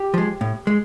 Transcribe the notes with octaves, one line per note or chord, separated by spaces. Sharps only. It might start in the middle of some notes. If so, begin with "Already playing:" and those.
Already playing: G4
F3 G#3
A2
G#3